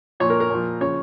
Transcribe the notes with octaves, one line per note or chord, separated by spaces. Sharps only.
A#2 F3 C#5
A#4
A#4
A#2 F3
C#3 F3 C#5